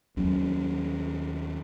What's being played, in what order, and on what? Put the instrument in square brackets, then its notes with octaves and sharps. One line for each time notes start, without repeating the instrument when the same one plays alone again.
[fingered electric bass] D#2 F#3 C#4